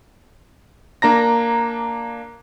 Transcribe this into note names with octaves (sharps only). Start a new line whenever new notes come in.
A#3 D4 A#5 A#6